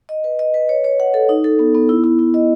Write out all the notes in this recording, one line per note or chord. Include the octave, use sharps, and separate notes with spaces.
D#5
B4
D#5
B4
C#5
C#5
F#5
A4
D#4
A4
B3
B3
E4
E4
E4
D#5